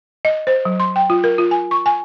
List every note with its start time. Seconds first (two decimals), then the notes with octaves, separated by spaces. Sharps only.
0.25 D#5
0.47 C5
0.65 F#3
0.80 C6
0.96 G5
1.10 F4
1.24 A#4
1.38 F4
1.51 G#5
1.71 C#6
1.86 G#5